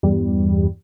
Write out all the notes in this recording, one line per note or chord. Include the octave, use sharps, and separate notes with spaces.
E2 G2 G3